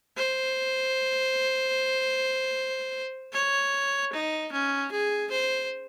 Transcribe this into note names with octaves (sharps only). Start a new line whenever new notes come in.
C5
C#5
D#4
C#4
G#4
C5